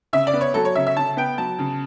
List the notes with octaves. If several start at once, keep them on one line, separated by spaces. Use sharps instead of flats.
C#3 E5
D5
B3
C#5
F#3 A4
C#5
C#3 E5
E5
C#3 A5
B3 G5
F#3 A5
C#3